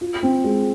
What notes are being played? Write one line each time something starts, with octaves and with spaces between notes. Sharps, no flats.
F4
C4
G#3